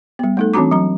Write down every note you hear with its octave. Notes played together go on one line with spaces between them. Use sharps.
G3 B3
A3 D#4 A4
E3 C4 D4 F#4 A#5 D6
F#3 A#5